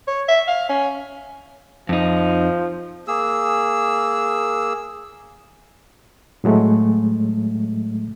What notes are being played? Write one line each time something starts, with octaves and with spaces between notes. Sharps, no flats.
C#5
E5
F5
C#4
F2 F3 D#4
A#3 G#4 E6
A2 F#3 G#3 A3